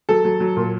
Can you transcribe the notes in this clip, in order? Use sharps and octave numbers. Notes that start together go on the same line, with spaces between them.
F#3 A4
F#3
F#3
A#2